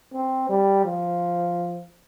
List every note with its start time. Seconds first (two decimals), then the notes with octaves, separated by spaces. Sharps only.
0.13 C4
0.49 G3
0.85 F3